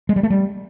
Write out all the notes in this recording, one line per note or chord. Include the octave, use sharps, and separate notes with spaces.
G#3
G3
A3
G3